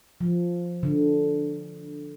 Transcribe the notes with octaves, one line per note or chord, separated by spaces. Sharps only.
F3
D3